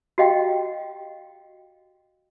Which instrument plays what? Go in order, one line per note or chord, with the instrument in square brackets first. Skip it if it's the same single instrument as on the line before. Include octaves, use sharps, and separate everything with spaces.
[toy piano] F#4 G4 D#5 F5 G5